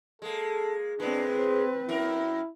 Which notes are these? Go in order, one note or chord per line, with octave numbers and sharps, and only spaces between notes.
G#3 A#3 A4
A2 G#3 C4 D4 B4
C5
F#2 E4 A#4